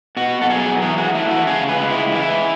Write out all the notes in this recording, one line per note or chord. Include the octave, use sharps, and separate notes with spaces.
B2 F#4
A4
F#3 G#4
E3 G#4
F#4
A3 E4
F#4
C#3 G#4
B4
G#3
E4
E3 E4